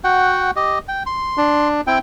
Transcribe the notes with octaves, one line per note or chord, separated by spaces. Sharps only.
F#4 F#5 G5
G4 D#5
G5
C6
D4
C4 E4 G5